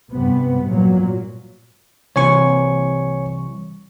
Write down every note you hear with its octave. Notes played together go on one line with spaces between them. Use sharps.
G2 C3 B3
A#2 F#3
C2 C3 E3 C#5 G#5 C#6